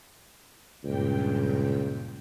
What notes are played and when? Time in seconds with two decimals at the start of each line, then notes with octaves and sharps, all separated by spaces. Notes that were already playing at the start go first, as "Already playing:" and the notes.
0.84 C#2 G2 A#2 G5